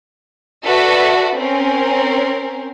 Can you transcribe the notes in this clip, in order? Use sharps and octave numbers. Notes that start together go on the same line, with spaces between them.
F#4 A4 B4 D5 E5
C4 C#4 A#4